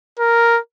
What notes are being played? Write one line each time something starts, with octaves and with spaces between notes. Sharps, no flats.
A#4